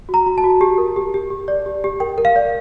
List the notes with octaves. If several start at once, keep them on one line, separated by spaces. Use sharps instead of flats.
F#4
A#5
F#4
A5
F#4
G4
A#4
G4
G4
G4
D5
G4
G4
A#4 G5
A#4
F5
D5